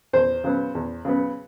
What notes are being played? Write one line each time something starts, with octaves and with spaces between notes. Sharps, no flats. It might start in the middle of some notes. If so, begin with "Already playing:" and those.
E2 C5
C#3 F#3 B3
E2
C#3 F#3 B3